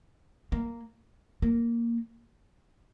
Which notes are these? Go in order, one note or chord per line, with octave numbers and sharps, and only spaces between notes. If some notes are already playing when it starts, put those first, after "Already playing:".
A#3
A#3